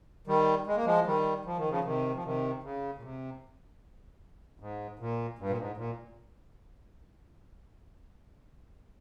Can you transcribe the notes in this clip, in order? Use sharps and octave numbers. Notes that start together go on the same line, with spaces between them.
D#3 G3
G#3
A#3
F3 G#3
D#3 G3
F3
D#3
C#3 F3
C3 D#3
F3
C3 D#3
C#3
A#2
C3
G#2
A#2
G2
A#2
G#2
A#2